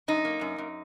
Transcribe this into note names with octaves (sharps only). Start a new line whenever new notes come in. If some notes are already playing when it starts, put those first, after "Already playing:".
F#2 D#4
A#3
F#2
F#2